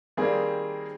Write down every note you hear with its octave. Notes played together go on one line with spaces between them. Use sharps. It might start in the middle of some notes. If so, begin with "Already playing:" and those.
D#3 G3 A#3 C4 G#4